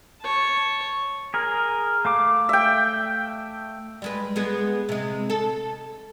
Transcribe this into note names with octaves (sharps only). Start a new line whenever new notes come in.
C#5 A5
G#4 A#4
A3 F5 D6
E5 G5
G3 G#3 B4
G#3 B3 G#4
C3 G#3
A4